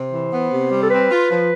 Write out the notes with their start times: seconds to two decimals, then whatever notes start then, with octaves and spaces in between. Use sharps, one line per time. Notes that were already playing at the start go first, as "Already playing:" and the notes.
Already playing: C3 C5
0.12 E3
0.32 B3
0.51 C3
0.71 G3
0.82 A4
0.90 C4 B4
1.10 F4
1.30 F3